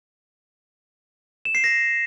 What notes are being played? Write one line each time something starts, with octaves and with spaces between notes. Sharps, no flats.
E7
C7
A#6